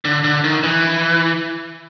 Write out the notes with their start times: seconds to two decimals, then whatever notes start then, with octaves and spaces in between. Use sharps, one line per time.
0.05 D3
0.24 D3
0.44 D#3
0.63 E3